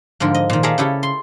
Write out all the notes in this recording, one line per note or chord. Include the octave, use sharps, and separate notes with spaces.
G#2 D3 F3 A#4
D#5
A#2 D#3
G#4 A4 D5 E5 F5 A#5
C#3 E4 G4 A4
C6